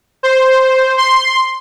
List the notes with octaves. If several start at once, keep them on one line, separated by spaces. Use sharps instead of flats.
C5
C6